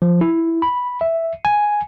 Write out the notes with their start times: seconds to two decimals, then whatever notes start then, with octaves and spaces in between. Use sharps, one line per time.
0.02 F3
0.21 E4
0.62 B5
1.01 E5
1.45 G#5